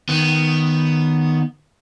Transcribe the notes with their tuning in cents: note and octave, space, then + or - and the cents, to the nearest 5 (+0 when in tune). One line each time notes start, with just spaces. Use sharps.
D#3 +0 B3 +5